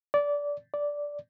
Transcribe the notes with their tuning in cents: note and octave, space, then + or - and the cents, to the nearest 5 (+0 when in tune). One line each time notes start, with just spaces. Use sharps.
D5 -20
D5 -10